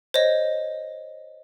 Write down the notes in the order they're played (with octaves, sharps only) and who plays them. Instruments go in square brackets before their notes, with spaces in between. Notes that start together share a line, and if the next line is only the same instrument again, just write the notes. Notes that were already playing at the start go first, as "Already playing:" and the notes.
[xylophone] C5 C#5 D#5